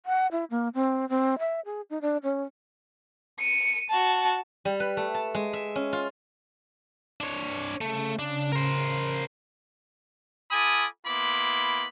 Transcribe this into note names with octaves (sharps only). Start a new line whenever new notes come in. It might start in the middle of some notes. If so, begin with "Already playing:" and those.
F#5
E4
A#3
C4
C4
E5
G#4
D#4
D4
C#4
C#7 D#7
F#4 A5
G3
B4
A3
A5
G#3
E5
C#4
F4
D4 C#5
C#3 A3
D4
A#4 C5
F4 A4 G#5 B5 D6 D#6
A#3 B3 E4 B5 C6 D6